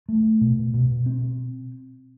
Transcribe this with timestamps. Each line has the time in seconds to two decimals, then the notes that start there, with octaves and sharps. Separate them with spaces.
0.09 A3
0.41 B2
0.74 B2
1.06 C4